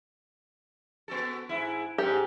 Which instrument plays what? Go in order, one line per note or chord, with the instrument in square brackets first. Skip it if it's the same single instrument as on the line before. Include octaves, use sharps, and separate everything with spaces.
[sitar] B3 F#4 A4
G#2 E4
[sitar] G#2 [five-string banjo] G4